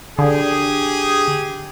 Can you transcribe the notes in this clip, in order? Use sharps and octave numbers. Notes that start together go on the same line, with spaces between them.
D3 G4 G#4